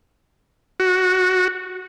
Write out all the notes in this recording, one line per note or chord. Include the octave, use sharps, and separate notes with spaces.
F#4